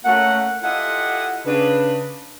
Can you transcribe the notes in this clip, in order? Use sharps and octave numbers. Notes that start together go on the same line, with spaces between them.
A3 A#3 C#4 F#5
E4 F4 G4 A4 D#5 F#5
C#3 D4 B4